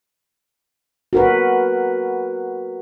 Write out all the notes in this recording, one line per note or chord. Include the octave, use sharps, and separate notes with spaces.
F#4 A#4 B4